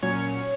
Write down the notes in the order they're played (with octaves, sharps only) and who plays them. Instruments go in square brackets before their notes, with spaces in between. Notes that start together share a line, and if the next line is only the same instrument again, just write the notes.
[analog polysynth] A#2 F#3 C#4 C#5